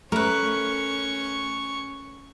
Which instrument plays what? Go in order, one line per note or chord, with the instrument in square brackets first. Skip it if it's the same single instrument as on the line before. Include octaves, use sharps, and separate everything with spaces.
[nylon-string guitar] A3 [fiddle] C#4 C#6 [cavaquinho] A#4 B4